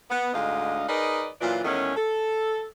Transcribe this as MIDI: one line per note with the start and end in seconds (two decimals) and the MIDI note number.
0.10 0.30 59
0.34 0.85 38
0.34 0.85 44
0.34 0.85 50
0.34 0.85 75
0.34 0.85 77
0.87 1.29 63
0.87 1.29 68
0.87 1.29 70
0.87 1.29 71
0.87 1.29 74
0.87 1.29 75
1.41 1.62 46
1.41 1.62 52
1.41 1.62 54
1.41 1.62 62
1.41 1.62 65
1.64 1.93 40
1.64 1.93 51
1.64 1.93 56
1.64 1.93 57
1.64 1.93 61
1.96 2.64 69